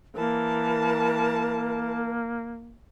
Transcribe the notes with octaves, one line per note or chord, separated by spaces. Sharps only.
E3 A#3 A#4 A5